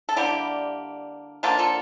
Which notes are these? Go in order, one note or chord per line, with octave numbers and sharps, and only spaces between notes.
A4
D3 G3 A#3 E4 G4
D3 F3 A#3 F4 A4
F4 A4